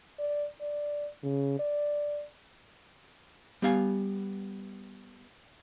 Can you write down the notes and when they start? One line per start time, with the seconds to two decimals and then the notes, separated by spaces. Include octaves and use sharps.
0.19 D5
0.61 D5
1.23 C#3
1.59 D5
3.62 G3 B3 F5 G#5